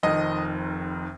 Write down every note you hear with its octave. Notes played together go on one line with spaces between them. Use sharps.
F1 F2 D#3 D#5